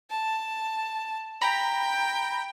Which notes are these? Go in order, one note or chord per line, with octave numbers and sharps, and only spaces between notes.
A5
G5 A#5 B5